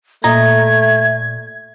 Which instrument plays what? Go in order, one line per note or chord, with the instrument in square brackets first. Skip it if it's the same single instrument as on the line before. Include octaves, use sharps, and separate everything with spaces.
[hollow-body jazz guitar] A#2 D#5 A#5 [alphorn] A3 [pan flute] E5 [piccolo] G#6